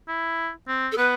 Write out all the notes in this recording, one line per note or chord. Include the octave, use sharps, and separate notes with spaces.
E4
C4
A4
B3 B4